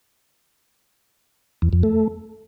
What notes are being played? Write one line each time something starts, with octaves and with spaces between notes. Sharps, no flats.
E2
F2
A3